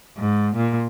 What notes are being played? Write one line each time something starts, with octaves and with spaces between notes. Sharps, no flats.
G#2
A#2